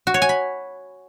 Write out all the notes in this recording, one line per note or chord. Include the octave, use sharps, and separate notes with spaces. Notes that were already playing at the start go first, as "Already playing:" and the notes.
F#4
C#5
G#5
B5